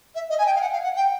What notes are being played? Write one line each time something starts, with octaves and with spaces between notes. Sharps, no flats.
E5
D#5
G#5
G5
F5
F#5
F5
F#5
G5